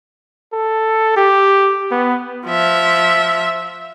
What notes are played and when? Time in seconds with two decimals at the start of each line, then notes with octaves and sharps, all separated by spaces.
0.53 A4
1.16 G4
1.91 B3
2.46 F3 E5